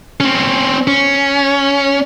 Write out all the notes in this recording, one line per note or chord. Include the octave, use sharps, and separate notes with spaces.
C4 C#4
C#4